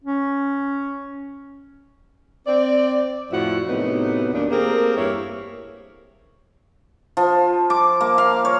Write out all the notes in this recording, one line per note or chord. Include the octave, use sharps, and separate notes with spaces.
C#4
C4 D5
F2 A2 F3 E4 F#4 F#5
F#2 A2 C3 F#3 B3 D#4
D#2 A#2 D4
A3 A#3 C4 G4 G#4 A#4
E2 G2 A#3 E4 G4 C#5
F3
D6
A#3
F5
C#5